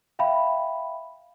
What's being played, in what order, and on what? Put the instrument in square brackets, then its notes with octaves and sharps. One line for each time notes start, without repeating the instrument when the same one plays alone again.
[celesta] E5 F5 G5 B5